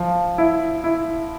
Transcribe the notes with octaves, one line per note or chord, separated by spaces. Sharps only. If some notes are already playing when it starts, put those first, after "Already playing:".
Already playing: F3
E4
E4